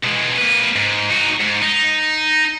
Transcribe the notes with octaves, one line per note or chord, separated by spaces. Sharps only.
B2 G#3
A#3 B4
G#2
D#4 F#4
G#2
D#4